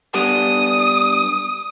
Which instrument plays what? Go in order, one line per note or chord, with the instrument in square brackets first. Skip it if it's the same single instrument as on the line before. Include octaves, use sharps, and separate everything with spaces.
[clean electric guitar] G3 B3 D4 [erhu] D#6